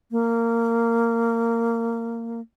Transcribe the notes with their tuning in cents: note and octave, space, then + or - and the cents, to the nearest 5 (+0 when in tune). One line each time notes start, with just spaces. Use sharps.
A#3 -15